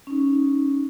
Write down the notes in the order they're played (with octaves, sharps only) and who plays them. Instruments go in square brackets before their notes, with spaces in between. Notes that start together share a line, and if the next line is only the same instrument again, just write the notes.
[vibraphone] C#4 D#4